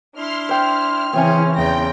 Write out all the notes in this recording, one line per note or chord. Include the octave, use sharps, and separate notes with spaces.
D4 E4 C6 F6
C5 G5 F6
C#3 E3 C4 C#4 G#4 E5 G#5
E2 C#3 G5 A#6